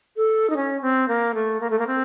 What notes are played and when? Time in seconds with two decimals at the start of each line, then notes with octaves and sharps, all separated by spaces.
0.16 A4
0.50 D#4
0.56 C#4
0.82 C4
1.08 A#3
1.34 A3
1.61 A#3
1.70 A3
1.79 A#3
1.87 C4